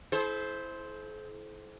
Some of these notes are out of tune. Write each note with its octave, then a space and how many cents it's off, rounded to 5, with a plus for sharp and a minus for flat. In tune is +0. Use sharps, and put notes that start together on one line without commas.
E4 +0 A4 -45 C5 +0